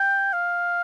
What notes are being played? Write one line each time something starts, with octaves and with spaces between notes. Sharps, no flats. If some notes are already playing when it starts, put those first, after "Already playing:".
Already playing: G5
F5